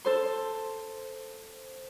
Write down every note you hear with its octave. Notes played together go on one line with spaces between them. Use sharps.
A4 C5 C6